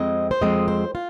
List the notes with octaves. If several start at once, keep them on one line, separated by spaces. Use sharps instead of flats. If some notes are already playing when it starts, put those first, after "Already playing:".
Already playing: F2 G#3 C4 D#5
C5
F2 F3 G#3 C4 D#5
C5
F4